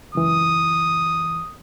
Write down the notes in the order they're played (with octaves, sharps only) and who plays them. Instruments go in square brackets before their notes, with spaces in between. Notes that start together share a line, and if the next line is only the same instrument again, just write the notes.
[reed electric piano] C#2 F#2 E3 [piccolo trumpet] D#6